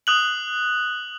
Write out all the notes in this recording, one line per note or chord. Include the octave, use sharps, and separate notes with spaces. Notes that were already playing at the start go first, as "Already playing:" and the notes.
D#6 F#6 F#7